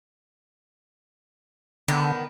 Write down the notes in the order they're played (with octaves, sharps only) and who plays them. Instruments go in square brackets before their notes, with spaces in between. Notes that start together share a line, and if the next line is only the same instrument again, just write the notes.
[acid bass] D3 [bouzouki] D#3 B3